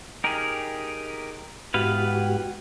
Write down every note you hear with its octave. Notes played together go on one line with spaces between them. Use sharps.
D#4 G4 G#4 A#4
G#2 B3 E4 F#4 G4 B4 F5